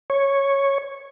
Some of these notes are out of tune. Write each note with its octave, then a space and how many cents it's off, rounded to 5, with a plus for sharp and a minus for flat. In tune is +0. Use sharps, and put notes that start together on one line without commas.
C#5 -5